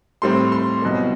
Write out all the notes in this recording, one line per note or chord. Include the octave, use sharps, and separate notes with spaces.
A2 G3 C4 C6
C6
C2 B2 F#3 C4